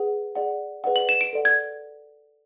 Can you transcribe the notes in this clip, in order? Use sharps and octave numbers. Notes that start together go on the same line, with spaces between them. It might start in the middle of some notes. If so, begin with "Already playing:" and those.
Already playing: G#4 B4 F#5
G#4 D5 F#5
G#4 B4 D5 F#5
F#7
E7
D7
A4 D5 F#5
G#6